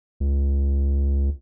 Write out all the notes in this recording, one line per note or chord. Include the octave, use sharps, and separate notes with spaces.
C#2